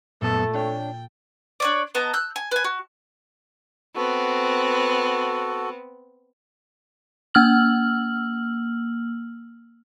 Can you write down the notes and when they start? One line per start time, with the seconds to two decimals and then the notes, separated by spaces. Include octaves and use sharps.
0.22 F#2 A#2 A3 B3 A4 A5
0.54 D4 C#5 G5
1.60 D4 C#5 D5
1.95 B3 D#5 A5 A#5
2.13 E6 F#6 G6
2.36 G#5
2.51 B4 G#5
2.64 F#4
3.96 B3 C4 F#4 A4
7.34 A#3 E6 F6 F#7